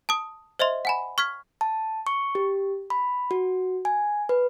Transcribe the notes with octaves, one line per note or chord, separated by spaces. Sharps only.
A5 D#6
C5 D#5 E5 C6
F#5 G#5 B5
C#6 F6 G#6 B6
A5
C#6
G4
B5
F#4
G#5
B4